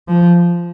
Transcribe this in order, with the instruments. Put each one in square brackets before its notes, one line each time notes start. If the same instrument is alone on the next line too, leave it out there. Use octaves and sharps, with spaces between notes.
[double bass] F3